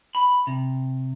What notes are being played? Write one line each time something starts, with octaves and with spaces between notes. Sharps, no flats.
B5
C3